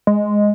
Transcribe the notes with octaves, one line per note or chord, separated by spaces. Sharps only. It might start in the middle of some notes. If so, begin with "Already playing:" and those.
G#3